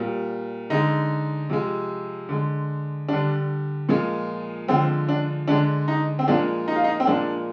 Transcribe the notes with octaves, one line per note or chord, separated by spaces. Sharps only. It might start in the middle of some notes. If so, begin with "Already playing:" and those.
Already playing: A#2 G3
D3 G#3 D#4
C3 F3 G#3
D3 G#3
D3 G3 D4
A#2 F3 G#3
D3 F3 G#3 C4
D4
D3 G#3 D4
D#4
C4
A#2 F3 G#3 D4
D#4
F4
D#4
C4
A#2 F3 G#3 D4